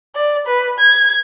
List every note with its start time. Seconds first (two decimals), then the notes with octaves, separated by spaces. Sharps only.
0.15 D5
0.47 B4
0.79 G#6